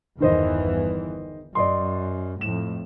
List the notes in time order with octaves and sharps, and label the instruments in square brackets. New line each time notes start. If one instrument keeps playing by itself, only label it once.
[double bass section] G1 E2 E3 [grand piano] D#3 C5 D#5
[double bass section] F#2 [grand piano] D5 D#5 C6
[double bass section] F2 A2 [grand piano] E7